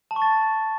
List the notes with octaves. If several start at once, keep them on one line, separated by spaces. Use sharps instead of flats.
A5
C#6
A6